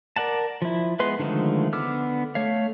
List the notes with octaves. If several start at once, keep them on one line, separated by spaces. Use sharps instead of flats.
A#4 D5 F#5 A5
F3 E4
G#3 B3 B4 C6
D3 D#3 F3 G#3 A3
D3 B3 D6 E6 F6
A3 C#5 F5